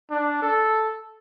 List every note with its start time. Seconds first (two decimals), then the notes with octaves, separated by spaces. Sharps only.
0.11 D4
0.42 A4